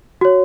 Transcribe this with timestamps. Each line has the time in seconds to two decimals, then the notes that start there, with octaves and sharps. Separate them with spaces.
0.21 F#4 C#5